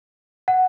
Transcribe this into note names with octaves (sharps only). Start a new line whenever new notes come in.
F#5